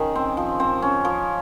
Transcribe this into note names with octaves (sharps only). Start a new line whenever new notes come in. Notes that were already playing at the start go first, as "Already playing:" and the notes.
Already playing: D#3 C#4 G#4
C4
F3
C4
C#4
F3